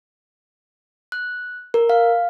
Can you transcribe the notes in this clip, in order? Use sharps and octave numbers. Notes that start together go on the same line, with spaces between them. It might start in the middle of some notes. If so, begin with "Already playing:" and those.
F#6
A#4
F5